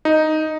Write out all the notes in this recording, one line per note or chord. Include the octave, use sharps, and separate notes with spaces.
D#4